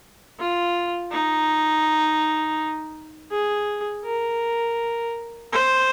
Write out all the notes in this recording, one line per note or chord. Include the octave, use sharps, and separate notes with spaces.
F4
D#4
G#4
A#4
C5